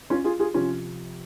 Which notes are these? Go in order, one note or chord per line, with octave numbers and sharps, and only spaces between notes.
C#4 F4
F4 G#4
F4 G#4
C3 F3 C#4 F4